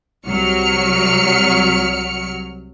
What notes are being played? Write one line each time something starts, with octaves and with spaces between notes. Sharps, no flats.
C2 F#3 F6 C#7